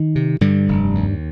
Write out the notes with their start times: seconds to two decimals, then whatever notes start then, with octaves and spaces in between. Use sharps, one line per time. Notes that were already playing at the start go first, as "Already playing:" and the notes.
Already playing: D#3
0.16 C3
0.41 G2 D3 G3
0.68 F1
0.95 D#2